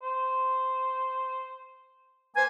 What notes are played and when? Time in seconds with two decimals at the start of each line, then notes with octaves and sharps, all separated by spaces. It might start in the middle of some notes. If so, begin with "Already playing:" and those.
0.02 C5
2.35 A#3 B4 C5 G#5